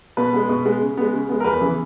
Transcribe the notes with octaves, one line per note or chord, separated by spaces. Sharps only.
B2 B4
G#3 B3
B2
G#3 B3
C#3
G#3 B3
C#3
G#3 B3
A#4
E2 B4
C#3 E3 B3